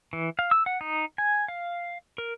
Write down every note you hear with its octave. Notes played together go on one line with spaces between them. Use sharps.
E3
F5
E6
F#5
D#4
G#5
F5
A#4